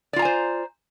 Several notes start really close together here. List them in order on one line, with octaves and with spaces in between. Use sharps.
D5 F4 A#5 G#5 C5